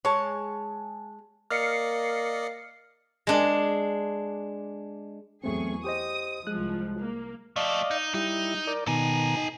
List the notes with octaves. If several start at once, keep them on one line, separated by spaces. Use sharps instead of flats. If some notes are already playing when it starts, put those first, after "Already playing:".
G#3 C#5 A5
A#3 D5 D#5 F6 C7 C#7
G#3 D4
E2 F#3 A3 C4 G#4 C#6
G4 C5 D#5 D#6
C2 F3 G#3 F#6
A#3
F3 A3 D5 D#5 F5
D#4
G3 D#4 E4
A#4 D5
B2 D#3 A4 G#5 A#5
D#4